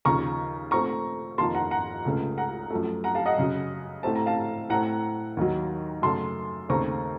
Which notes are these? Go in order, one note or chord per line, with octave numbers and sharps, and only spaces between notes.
D#2 C#3 F3 A#5 C#6
A#2 A3 C4 A#5 C#6
F2 D#3 A#3 A5 C6
F#5 A#5
F#5 A#5
C#2 C#3 A3
F#5 A#5
F#2 F3 A3
F#5 A#5
F5 A5
D#5 F#5
F#2 C#3 F#3
A2 A3 C4 A5
A#5
F5 A5
A2 A3 C4 F#5 A#5
D#2 D#3 F#3
F#2 C#3 A3 A5 C6
D#2 C#3 A3 C4 A#5 C#6